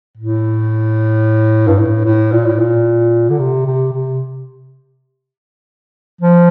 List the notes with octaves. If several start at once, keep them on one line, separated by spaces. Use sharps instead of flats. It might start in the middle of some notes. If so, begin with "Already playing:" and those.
A2
G2
A2
A2
A#2
A2
A#2
D3
C3
C3
C3
F3